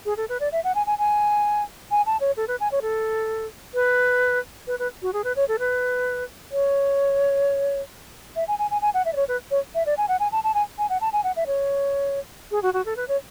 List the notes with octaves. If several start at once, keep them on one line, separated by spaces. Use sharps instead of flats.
G#4
A4
B4
D5
E5
F#5
G#5
G#5
G#5
G#5
A5
C#5
A4
B4
G#5
C#5
A4
B4
B4
B4
F#4
G#4
B4
C#5
A4
B4
C#5
E5
G#5
G#5
G#5
G#5
F#5
E5
D5
C#5
B4
C#5
E5
D5
G#5
F#5
G#5
A5
A5
G#5
G#5
F#5
A5
G#5
F#5
E5
C#5
G#4
F#4
F#4
A4
B4
C#5